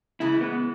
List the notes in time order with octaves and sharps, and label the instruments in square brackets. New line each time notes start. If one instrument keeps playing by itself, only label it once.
[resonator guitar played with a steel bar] C#3 E3 G#3 [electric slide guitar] E4
[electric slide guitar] B3